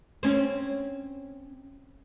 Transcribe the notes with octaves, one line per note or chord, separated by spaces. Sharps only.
C4 C#4